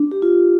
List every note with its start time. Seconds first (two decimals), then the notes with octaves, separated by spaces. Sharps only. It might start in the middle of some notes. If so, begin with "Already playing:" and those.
Already playing: D4
0.12 G4
0.22 F4